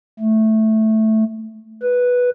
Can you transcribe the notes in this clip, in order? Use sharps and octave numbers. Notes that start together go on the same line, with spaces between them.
A3
B4